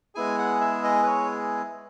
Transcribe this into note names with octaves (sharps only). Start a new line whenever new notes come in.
G#3 B3 E4 G#4 G#5
F#5
E5
D#5
B4
C#5